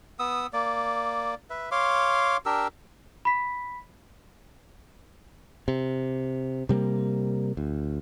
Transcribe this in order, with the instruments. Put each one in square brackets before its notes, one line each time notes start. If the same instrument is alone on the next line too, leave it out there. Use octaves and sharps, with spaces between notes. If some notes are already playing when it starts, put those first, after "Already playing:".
[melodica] B3 D#6 E6
A#3 D5
B4 E5
C#5 F5 C6 D6
D4 G4 A#4 E6
[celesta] B5 B6
[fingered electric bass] C3
C3 G3 A3 A#3
D2